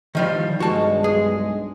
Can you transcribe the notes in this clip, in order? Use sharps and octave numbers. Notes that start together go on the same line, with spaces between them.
D#3 F3 G3
B1 G2 G#3 F#4 A5
G#4